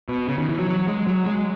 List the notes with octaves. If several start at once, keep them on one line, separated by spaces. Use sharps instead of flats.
B2
C#3
D#3
E3
F#3
F#3
G#3
F#3
G#3